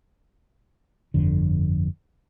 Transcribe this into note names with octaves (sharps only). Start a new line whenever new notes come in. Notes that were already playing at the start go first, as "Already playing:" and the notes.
G1 F2 D3